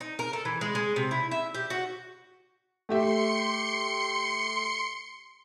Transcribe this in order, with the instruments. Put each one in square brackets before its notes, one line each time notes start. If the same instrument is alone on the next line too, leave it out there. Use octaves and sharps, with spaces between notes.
[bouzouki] D#4
A#4
A4
E3
G#3
G#3
C3
E4
E5
G4
F#4
[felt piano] A3 G4 E5 [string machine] C6 C#7